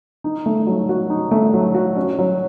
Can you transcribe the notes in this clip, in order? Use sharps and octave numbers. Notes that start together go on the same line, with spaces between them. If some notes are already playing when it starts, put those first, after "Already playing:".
D#4
A3
F#3
F#4
D#4
A3
F#3
F#4
C#4
F#3